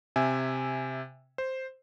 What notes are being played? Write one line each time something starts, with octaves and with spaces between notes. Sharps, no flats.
C3 E5 G#5
C5